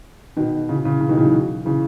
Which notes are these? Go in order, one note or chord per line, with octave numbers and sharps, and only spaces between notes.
B2 D#3
C#3 E3
C#3 E3
C#3 E3
B2 D#3
C#3 E3
D#3 F#3
C#3 E3